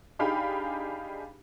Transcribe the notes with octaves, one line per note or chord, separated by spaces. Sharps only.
D4 D#4 G4 G#4 F5 B5